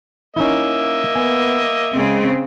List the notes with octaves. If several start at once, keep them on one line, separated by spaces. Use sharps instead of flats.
A#3 C#4 D#4 E4 D#5 E5
B3 G#5
C#3 G#3 C4